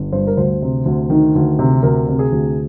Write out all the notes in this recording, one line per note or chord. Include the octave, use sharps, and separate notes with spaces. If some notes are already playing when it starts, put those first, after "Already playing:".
Already playing: G1
G2 C5
A#4
D2 C5
C3
D2
D#3
D2
C3
D2 A#4
C3
G#4
D2